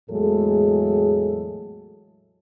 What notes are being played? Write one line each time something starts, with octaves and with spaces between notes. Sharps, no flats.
E2 A2 F#3 G#3 G#4 A4